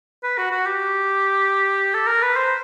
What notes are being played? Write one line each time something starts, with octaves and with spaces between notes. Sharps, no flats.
B4
F#4
F#4
G4
A4
A#4
B4
C5